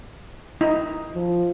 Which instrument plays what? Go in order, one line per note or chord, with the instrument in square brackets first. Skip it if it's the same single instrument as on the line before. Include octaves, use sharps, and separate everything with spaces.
[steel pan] D#4 E4
[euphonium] F3